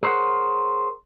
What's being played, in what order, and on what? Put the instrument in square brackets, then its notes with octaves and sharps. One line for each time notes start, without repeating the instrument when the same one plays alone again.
[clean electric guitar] G#4 A#4 C5 C#5 F#5